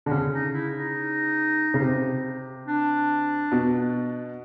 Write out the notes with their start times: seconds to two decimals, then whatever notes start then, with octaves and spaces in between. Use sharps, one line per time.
0.06 D3 C4
0.11 C#3 C#4
0.33 D#4
0.53 E4
0.75 D#4
1.74 C#3
1.81 C3
2.66 D4
3.52 B2